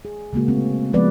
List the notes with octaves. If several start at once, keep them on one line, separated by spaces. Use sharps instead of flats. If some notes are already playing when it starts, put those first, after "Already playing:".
G#4
C#3 G#3 A#3 F#4
A3 C4
F3 G#3 B3 B4 D5